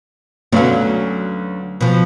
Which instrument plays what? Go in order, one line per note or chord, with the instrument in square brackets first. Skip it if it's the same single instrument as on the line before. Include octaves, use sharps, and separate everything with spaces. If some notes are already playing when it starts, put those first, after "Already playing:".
[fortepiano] D2 B4 F5 [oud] F#3 C#4
[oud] B2 F3